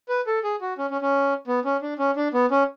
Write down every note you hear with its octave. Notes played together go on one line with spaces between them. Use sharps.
B4
A4
G#4
F#4
C#4
C#4
C#4
B3
C#4
D4
C#4
D4
B3
C#4